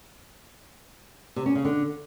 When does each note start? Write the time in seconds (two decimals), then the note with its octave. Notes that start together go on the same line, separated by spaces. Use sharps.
1.36 C3
1.46 C#4
1.55 C#3
1.65 D3